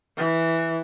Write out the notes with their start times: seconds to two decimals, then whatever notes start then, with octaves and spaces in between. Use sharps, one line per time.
0.17 E3